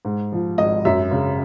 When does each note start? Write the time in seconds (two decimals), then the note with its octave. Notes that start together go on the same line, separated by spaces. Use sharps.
0.05 G#2
0.32 F3
0.58 G#1 D#5
0.85 F#2 E5
1.11 C#3